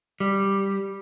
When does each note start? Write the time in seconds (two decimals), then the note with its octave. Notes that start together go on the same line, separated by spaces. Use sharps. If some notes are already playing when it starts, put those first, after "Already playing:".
0.20 G3